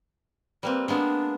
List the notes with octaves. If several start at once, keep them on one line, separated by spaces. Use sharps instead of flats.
G3 A#3 C4 B4
G#3 A#3 B3 D4